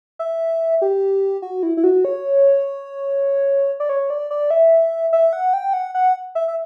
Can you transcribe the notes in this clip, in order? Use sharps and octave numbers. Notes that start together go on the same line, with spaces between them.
E5
G4
F#4
E4
E4
F#4
C#5
D5
C#5
D5
D5
E5
E5
F#5
G5
F#5
F#5
E5
E5